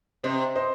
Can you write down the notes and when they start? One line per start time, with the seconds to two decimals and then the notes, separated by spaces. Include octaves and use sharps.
0.23 C3 C5 D#5
0.55 C5 D#5